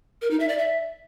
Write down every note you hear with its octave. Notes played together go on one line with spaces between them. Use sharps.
A#4
D#4
E5
D5
E5